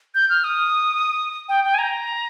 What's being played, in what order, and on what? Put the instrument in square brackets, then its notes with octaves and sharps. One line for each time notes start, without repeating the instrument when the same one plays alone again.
[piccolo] G6
F6
D#6
G5
G5
G#5
A#5